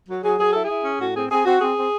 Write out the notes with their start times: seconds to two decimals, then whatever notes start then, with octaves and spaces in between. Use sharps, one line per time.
0.09 F#3
0.24 F#3 G#4
0.38 F#3 G#4
0.52 E4 A4
0.64 G#4
0.70 E4
0.84 C#4
0.99 A2 F#4
1.15 C4 G#4
1.30 C4 G#4
1.45 C4 F#4
1.61 C4 G#4
1.77 C4